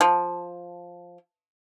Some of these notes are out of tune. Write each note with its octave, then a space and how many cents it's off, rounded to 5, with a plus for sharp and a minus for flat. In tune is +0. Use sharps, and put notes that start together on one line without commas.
F3 +5